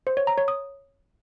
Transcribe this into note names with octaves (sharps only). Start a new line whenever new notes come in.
C5
C#5
A#5
C#5
D#6